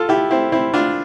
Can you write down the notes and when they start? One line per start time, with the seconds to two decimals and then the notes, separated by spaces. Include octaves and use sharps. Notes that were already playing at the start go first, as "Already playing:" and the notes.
Already playing: F4 A4
0.09 E4 G4
0.31 C4 E4
0.52 C4 E4
0.74 D4 F4